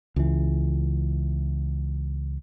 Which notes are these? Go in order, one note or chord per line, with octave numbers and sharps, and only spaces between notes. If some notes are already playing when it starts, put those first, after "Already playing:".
C#2 E3